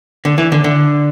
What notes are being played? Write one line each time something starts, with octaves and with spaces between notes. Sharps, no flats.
D3
E3
D3
D3